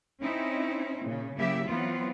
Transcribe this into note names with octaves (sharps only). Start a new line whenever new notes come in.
C4 C#4 D#4 E4
A#2 C#3
C#3 F#3 A#3 E4 G4 E5
E3 F#3 B3 C4 F4